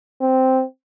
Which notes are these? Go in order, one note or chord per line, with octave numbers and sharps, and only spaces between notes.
C4